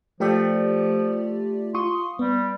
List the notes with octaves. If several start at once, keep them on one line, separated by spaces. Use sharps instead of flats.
F3 A3 F4 G4 D5
F4 C6 C#6 D#6
G3 B3